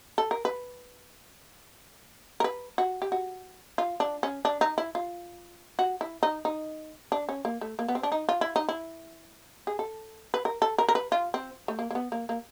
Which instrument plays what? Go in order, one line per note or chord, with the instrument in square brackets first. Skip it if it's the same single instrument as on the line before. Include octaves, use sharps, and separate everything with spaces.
[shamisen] A4
A#4
B4
A#4
B4
F#4
G4
F#4
F4
D4
C#4
D4
D#4
E4
F4
F#4
E4
D#4
D#4
D4
C#4
A#3
A3
A#3
B3
C4
D4
D#4
F4
E4
D#4
E4
G#4
A4
B4
A#4
A4
A#4
A#4
B4
F4
C4
A3
A#3
A#3
B3
A#3
A#3